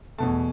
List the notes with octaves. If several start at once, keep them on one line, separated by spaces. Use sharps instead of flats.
E2 B2 A3 A5